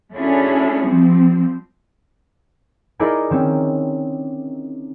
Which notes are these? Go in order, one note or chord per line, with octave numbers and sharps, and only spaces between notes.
A3 C#4 D4 E4 F#4 G#4
F3 G3 C4
D#4 E4 G#4 A#4 D5 D#5
D#3 C4 C#4